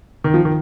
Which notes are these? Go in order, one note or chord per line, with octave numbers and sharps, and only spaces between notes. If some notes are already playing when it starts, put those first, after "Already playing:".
D#3
F3
D#3